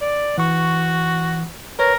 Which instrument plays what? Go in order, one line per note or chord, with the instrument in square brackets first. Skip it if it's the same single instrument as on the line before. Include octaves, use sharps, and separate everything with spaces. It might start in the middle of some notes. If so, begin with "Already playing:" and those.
[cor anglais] D5
[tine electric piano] E3 C#6 [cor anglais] F#4
[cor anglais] A#4 [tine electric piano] B4 C#5